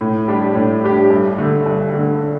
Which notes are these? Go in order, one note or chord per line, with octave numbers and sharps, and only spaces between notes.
A2
G3 D4 G4
A2
G3 D4 G4
G2
D3 A3
G2
D3 A3